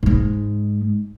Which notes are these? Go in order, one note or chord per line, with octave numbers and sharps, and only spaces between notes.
G#2 G#3